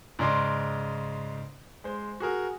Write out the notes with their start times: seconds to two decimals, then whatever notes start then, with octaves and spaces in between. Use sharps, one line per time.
0.19 G#2 C#3 D5 D#5 C6
1.84 G#3 C5
2.20 F#4 G#4 A#4